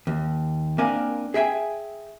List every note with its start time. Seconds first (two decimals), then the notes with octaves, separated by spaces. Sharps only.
0.07 D#2
0.78 A#3 C4 D4 A#4 F5 G#5
1.34 G#4 E5 G5 G#5